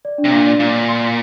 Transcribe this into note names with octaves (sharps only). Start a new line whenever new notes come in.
D5
D4
C3
A#2 D4
D5
A#2 D5
D5
C6
C6